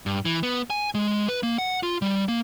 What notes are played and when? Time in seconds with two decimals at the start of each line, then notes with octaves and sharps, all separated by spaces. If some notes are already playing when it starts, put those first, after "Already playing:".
0.06 G2
0.25 E3
0.43 B3
0.70 G#5
0.95 G#3
1.28 B4
1.43 A#3
1.58 F#5
1.83 F4
2.02 G3
2.28 A#3